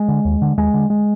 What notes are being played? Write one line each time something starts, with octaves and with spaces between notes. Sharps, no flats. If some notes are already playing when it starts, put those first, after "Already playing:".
Already playing: G#3
D3
D#2
D3
D#2 G#3
D3
G#3